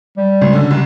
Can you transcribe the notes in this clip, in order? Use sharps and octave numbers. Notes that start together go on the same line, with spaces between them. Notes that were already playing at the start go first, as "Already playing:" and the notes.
G3
G#1 C#3
D3 C#4
C2